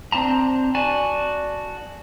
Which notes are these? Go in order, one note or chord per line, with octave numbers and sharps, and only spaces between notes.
C4 D4 A5 A#5
F#4 D5 G#5 A5